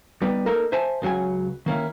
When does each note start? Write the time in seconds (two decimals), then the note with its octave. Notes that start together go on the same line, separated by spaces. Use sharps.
0.22 G3 B3 D#4 G4
0.46 A#3 D#4 A4 A#4
0.72 C5 E5 G#5 A5
1.02 C#2 C#3 F#3 F#5 G#5
1.66 D#3 A#3 C#4 E4